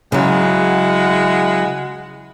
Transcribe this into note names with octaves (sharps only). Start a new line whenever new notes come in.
C#3 F#3 G#3 E4 F#5